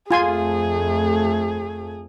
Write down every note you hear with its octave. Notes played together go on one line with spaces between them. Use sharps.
F2 A3 F4 G#4 G#5 C6